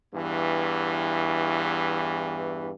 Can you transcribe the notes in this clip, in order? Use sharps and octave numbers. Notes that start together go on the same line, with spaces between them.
E2 G2 E3